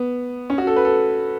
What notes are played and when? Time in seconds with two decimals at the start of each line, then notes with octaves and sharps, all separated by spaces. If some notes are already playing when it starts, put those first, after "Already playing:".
Already playing: B3
0.50 C#4
0.58 F#4
0.67 A4
0.76 B4
0.85 A4